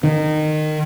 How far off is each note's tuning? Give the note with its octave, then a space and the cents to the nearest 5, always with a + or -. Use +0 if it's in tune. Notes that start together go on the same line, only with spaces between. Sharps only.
D#3 -20